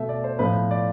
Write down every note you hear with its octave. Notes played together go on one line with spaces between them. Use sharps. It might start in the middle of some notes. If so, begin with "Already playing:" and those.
Already playing: B2 A3 E5
D5
C5
A2 F3 B3 B4
D5